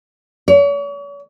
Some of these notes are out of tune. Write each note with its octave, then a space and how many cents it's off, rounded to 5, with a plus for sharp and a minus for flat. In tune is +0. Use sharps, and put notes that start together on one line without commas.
C#5 +40